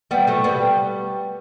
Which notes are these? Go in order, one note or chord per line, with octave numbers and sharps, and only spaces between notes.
G3 B3
F#3 A3
G3 B3